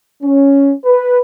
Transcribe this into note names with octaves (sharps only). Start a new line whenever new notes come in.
C#4
B4